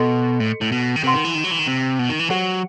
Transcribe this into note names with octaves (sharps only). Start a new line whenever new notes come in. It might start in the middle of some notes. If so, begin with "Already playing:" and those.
Already playing: B2 A4 D#5 C6
A2
A2
B2
D#3
C3 G4 B4 F#5 C6
D#3
E3
D#3
F#3
E3
D#3
C3
B2
D#3
E3
F#3 G4 C5 F#5